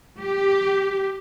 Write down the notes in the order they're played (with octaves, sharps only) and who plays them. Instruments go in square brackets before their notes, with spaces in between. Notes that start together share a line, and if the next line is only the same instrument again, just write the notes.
[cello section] G4